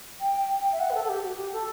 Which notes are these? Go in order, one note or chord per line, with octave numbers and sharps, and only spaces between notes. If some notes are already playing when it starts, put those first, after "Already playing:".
G5
E5
F#5
B4
A4
A4
G4
F#4
G4
A4